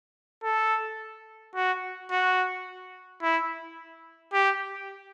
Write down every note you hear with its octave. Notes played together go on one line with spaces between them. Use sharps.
A4
F#4
F#4
E4
G4